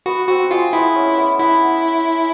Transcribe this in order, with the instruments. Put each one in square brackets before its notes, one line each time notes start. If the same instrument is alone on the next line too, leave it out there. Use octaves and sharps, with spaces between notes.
[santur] B3 [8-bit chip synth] F#4
[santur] C4 [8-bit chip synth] F#4
[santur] G#3 [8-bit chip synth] F4
[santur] B3 [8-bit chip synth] E4
[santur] C#4
B3
[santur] B3 [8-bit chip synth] E4